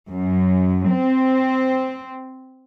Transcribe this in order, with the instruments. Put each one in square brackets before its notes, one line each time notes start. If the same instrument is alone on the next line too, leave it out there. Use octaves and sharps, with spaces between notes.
[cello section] F#2
C4